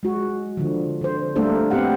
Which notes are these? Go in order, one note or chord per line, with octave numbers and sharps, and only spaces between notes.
G#3 F#4
D3 F3
D3 C5
G3 A3 A#3 D4 A4 C5
B3 C4 G4 F5 F#5